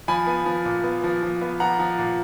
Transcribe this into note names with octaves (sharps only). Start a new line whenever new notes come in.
F3 G#5 B5
B3
F3
A#2
B3
F3
F3
B3
F3 F#5 A#5
F3
A#2